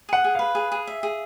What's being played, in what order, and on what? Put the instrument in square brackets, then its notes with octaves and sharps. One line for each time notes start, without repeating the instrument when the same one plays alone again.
[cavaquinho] G#4 [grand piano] F#5
[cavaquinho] G#4
[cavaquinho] B4 [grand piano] F5
[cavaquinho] G#4
G#4
E5
G#4